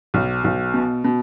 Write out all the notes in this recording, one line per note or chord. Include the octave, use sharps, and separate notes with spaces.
B1
B1
B2
B2